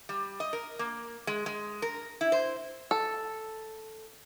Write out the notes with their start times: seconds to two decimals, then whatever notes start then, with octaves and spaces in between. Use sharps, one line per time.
0.09 G3
0.40 D#5
0.53 A#4
0.79 A#3
1.27 G#3
1.46 G#3
1.82 A#4
2.21 E4
2.32 C5
2.91 A4